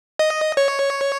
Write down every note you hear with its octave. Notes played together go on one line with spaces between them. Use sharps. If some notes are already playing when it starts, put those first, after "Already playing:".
D#5
C#5